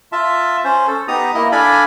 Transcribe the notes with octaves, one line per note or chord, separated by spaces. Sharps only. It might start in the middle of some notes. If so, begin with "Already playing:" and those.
F4 E5 A5
C#4 C5
A4
B3 D#4 G4 A#5 D#6
A#3 E4 D#5
D4 A4 D5 F5 G#5 B5